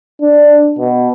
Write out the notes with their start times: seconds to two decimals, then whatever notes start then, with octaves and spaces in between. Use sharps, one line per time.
0.21 D4
0.78 B2